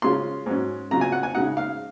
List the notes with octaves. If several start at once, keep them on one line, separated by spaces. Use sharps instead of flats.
C#3 G#3 C#4 F4 C6
G#2 F#3 C#4
C#3 F#3 C4 F4 A#5
G#5
F#5
G#5
C#3 G#3 D#4 F#5
F5